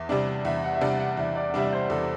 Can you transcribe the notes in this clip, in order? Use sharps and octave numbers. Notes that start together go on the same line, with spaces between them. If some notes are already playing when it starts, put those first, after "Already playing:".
Already playing: E2 E5
C3 G3 D4 D5
E2 E5
F#5
E5
C3 G3 D4 F#5
F#5
E2 E5
D5
F#5
C3 G3 D4 E5
D5
C5
E2 A4